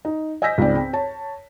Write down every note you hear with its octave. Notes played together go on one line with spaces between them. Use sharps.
D#4
D#5 G#5 E6 G6 A#6 B6
C#2 G#2 C4 D5
C4
C#5 A5